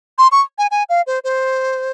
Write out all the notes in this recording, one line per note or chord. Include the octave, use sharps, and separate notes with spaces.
C6
C#6
G#5
G#5
F5
C5
C5